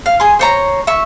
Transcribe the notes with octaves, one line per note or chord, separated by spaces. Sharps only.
F5
G#4 C6
C5 C#5 A#5
E5 C#6